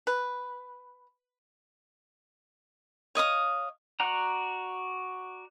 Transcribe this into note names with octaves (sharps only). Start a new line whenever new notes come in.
B4
C#5 D#5 F5 D#6
F#4 D5 F#5 A#5